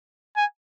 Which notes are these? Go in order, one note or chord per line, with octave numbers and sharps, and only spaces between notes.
G#5